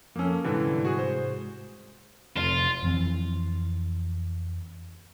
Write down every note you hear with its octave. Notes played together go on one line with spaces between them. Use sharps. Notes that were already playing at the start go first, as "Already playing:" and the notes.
F2 A#3 C#4 A4
C2 G#2 D3 E3 G3
F#4 G#4
C5
F1 F4
F2 E3 C4